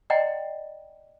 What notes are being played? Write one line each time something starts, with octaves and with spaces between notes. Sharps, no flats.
D5 D#5 F#5 G5 A#5 C6